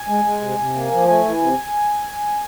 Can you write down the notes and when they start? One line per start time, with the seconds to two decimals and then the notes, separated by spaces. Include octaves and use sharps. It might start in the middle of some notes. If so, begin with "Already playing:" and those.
Already playing: G#5
0.08 G#3
0.25 G#3
0.42 C3
0.58 C3
0.75 A#3
0.92 F3
1.08 A3 G#5
1.25 E3
1.41 C3